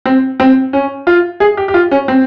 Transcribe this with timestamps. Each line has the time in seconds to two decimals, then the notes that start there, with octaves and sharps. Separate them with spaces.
0.06 C4
0.40 C4
0.73 C#4
1.07 F4
1.40 G#4
1.57 G4
1.68 G4
1.74 F4
1.91 C#4
2.08 C4